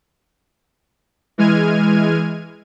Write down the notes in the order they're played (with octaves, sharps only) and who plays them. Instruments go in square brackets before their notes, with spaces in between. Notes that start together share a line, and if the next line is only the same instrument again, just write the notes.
[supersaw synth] E3 G#3 F6 G#6 D#7